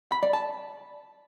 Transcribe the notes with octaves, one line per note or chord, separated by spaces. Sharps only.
B5
D5
A5